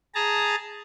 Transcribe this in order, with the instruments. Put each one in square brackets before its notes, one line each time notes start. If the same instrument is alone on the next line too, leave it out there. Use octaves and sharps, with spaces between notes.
[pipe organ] G#4 A5 A#5